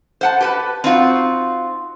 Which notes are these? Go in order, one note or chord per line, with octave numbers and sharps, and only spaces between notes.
C5 F#5 A5
G4 B4 A5
C4 D#4 F4 F#4